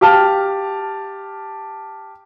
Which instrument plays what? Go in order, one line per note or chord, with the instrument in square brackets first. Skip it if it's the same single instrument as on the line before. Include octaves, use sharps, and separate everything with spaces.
[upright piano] G4 F5 A5 F6